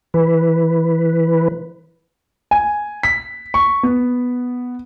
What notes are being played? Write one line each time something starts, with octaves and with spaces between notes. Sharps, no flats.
E3 B4
G#5
B6
C#6
B3